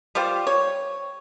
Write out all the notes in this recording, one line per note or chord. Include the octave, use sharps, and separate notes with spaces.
G3 F4 G4 C5
C#5